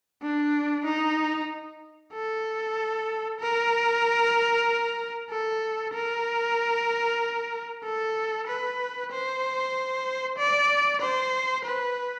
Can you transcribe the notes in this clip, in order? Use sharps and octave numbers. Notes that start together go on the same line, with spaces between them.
D4
D#4
A4
A#4
A4
A#4
A4
B4
C5
D5
C5
B4